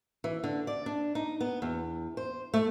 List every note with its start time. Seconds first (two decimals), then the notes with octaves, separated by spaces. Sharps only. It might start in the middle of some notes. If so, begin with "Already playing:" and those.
0.24 E3
0.44 D3
0.67 D5
0.86 D4
1.15 D#4
1.41 B3
1.62 E2
2.17 C5
2.54 A3